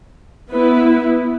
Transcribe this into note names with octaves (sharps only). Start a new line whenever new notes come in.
B3 E4 B4